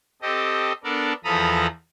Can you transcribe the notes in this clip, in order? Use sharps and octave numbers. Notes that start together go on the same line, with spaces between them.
C4 G4 A4 D#5
B3 D4 A4 A#4 D5
E2 F3 A4 A#5 B5 D#6